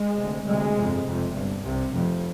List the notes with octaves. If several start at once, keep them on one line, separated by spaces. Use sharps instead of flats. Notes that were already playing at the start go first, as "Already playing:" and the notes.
Already playing: G#3
D2 C3
D2 C3 G#3
G1 F2 C3
F1 F2 C3
G1 G2
C2 C3
F1 F2 C3